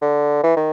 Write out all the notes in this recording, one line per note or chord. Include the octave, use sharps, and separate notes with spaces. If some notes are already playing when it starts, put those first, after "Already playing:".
D3
E3
D#3